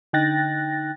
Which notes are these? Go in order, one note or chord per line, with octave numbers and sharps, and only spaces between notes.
D3 D#4 G5 F#6 A6 A#6